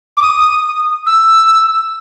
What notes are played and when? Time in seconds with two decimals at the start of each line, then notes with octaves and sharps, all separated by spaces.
0.17 D6
0.22 D#6
1.06 E6